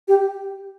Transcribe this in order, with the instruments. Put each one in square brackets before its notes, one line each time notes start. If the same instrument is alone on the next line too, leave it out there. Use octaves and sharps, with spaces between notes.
[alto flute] G4